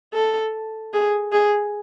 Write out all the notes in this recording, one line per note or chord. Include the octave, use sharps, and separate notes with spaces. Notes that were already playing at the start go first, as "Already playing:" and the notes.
A4
G#4
G#4